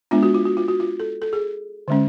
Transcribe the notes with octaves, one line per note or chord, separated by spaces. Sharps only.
G#3 B3 D4 F4
F#4
F4
F#4
F4
F#4
F4
A4
A4
G#4
D3 G#3 C#4